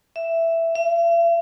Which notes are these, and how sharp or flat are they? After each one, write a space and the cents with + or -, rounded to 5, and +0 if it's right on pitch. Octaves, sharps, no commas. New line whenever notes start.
E5 +5
E5 +45